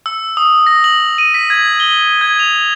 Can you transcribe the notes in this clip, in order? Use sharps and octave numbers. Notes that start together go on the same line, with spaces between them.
E6
D#6
A#6
F#7
D#7
B6
G#6
G7
G#6
F7